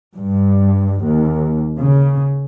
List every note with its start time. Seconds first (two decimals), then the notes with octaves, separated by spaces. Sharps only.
0.13 G2
1.02 D#2
1.80 C#3